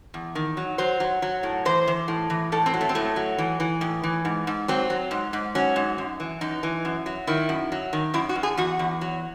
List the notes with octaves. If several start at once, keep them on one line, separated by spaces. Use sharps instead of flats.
E2
D#3
F#3
F#3 C5
F#3
F#3
A2
E3 C5
E3
A2
E3
A2 A4
C4
F#3
A3
C4
A2 A3
F#3
E3
E3
A2
E3
G#2
G#2
F#3 C4
F#3
G#2
G#2
F#3 C#4
G#2
F#2
E3
F#2 D#4
E3
F#2
F#3
D#3 E4
F#2
F#3
D#3
F#2 E4
F#4
F#2
G#4
E2 F#4
E2
F#3